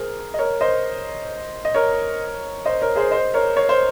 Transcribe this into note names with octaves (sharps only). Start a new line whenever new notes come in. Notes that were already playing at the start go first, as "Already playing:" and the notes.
Already playing: G#4 A#4 C5
D#5
A#4 C#5
C5 D#5
D#5
A#4 C#5
C5 D#5
A#4 C#5
G#4 C5
C5 D#5
A#4 C#5
C#5
C5